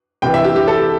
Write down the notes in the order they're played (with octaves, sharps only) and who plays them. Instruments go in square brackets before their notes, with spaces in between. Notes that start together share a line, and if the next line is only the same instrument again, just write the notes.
[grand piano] C2 C3 E3 G5
E5
G4
G4
A4